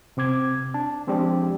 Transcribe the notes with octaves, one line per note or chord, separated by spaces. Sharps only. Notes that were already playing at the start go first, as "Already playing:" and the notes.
C3 C4 D6 G#6
D4 A5
F3 G#3 C4 D4 G4 D5